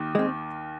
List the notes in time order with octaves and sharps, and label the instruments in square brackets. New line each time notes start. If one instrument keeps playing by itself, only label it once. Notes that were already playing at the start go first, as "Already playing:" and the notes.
Already playing: [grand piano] D#2 D#3
[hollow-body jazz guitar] G#3 C4